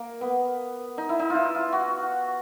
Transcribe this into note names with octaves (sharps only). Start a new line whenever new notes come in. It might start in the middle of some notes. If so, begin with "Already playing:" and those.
Already playing: A#3
B3
D#4
E4
D#4
F4
E4
F4
F#4